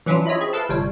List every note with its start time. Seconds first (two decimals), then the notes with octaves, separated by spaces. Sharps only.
0.06 E3 F#3 C#4 D4 E4 F4
0.26 F4 C#5 D#5 E5 B5
0.41 C4 G#4
0.53 E4 A4 B4 F5 A5
0.69 G1 C3 G3 C#5